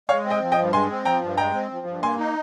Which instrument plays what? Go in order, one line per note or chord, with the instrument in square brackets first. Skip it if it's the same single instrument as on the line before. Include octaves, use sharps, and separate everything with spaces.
[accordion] G#3 [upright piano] C#5 F5
[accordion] C4
[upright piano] D#5 G5
[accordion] F3
[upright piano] D#5 G5
[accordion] G2
[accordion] G#3 [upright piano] G#5 C6
[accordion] C4
[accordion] F3 [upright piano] G5 A#5
[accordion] G2
[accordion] G#3 [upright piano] G5 A#5
[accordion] C4
F3
G2
[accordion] A#3 [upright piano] G#5 C6
[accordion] D#4